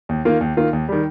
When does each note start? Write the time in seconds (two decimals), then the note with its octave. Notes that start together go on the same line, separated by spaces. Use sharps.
0.09 D#2
0.25 D#3 A#3 F4
0.41 D#2
0.57 D#3 A#3 F4
0.73 D#2
0.89 D#3 G3